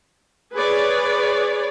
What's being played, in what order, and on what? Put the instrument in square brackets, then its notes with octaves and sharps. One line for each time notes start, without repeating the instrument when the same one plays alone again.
[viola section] G#4 B4 C#5 D5